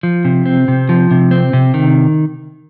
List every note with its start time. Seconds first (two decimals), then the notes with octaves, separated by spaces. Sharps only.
0.03 F3
0.25 C3
0.46 C4
0.68 C3
0.89 F3
1.11 C3
1.31 C4
1.53 C3
1.74 D#3